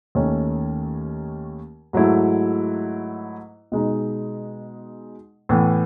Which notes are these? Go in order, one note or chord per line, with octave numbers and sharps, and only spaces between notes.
D#2 D#3 A3 C#4
G#2 F#3 A3 E4
B2 G#3 D#4
A2 E3 B3